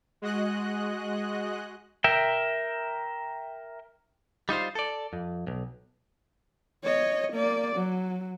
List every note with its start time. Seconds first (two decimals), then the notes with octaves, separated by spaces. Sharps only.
0.22 G#3 F#4 D#5 F#6
2.04 A#4 E5 G5
4.49 G3 D#4 F4 C5
4.75 A4 D5
5.13 F2
5.47 B1
6.84 C#5 D#5
7.33 A#3 D5
7.76 F#3